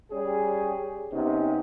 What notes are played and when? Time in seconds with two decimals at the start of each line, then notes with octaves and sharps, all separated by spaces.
0.12 G3 C#4 G#4
1.13 C3 B3 C#4 D#4